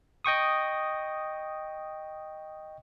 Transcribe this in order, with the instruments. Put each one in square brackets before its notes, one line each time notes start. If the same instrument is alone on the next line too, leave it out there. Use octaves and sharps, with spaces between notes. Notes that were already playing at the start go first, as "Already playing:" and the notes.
[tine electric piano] D#5 G5 C#6 D#6